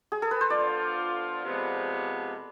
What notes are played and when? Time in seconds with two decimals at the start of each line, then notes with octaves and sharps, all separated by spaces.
0.12 G#4
0.22 A4
0.31 B4
0.41 C5
0.50 F3 B3 D4 F4 D5
1.44 C3 F3 G#3 B3